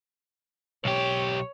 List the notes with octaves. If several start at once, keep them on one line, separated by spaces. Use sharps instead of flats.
B1 G4 C#5